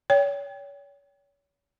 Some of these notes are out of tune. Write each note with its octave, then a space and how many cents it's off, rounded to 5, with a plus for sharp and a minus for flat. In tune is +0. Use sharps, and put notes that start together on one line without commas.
C#5 +35 G5 +0